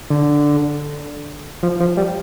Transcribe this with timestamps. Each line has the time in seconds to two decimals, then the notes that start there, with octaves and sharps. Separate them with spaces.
0.10 D3
1.63 F3
1.80 F3
1.97 G3